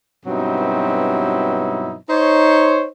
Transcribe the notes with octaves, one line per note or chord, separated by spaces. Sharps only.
G2 B2 F#3 C4 D#4 E4
D#4 C5 C#5